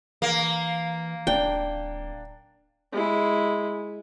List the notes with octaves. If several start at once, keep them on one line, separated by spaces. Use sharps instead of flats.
E3 A#3
D1 D4 G5
G#3 E4